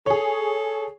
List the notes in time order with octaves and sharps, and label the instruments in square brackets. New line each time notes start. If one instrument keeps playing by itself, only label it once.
[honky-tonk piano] G#4 C#5 [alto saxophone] A4